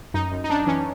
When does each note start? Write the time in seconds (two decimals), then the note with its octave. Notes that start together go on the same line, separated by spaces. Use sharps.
0.14 F#2 D#4
0.32 F#2
0.44 D#4
0.49 F#2 D4
0.67 E3 C#4